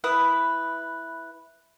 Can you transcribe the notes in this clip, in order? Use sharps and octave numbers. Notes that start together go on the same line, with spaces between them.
E4 B4 D#6